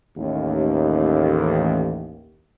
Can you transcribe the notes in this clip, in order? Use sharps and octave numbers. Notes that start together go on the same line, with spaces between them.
A1 D#2